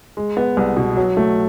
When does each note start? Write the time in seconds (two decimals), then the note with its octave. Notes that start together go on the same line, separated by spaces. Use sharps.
0.17 G#3
0.37 B3
0.57 C2
0.77 B2
0.97 F#3
1.17 A3